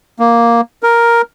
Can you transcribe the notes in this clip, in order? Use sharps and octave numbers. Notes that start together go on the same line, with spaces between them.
A#3
A#4